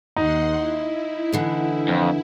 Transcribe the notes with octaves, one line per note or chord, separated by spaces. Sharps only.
D#2 D#4 F#5 C6
E4
D2 D3 E3
F2